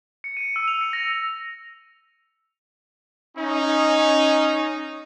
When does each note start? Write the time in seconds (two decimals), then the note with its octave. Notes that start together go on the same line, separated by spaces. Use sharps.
0.24 C#7
0.37 D#7
0.56 E6
0.68 F7
0.81 C#7
0.93 A#6
3.37 C#4 D#4